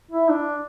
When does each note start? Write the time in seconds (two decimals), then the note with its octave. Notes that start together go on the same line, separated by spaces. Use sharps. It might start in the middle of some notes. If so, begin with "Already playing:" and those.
0.11 E4
0.29 D4